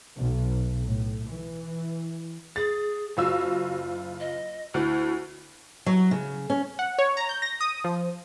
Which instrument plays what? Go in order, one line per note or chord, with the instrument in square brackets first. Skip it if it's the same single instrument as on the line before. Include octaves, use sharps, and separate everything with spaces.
[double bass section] B1
A2
E3
[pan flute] G#4 [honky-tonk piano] A6
[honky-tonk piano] F#1 F4 E6 [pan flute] F#4
[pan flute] D#5
[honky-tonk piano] D2 [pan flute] E4
[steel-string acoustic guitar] F#3
C#3
C#4
[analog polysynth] F#5
C#5
A#5
G6
A#6
D#6
F3